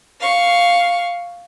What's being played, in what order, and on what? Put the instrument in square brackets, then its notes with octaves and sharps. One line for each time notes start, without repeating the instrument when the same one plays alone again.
[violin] F5 C#6